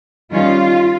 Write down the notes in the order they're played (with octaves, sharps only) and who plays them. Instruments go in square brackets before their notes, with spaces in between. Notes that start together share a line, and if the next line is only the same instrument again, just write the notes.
[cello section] D#3 G3 C#4 F4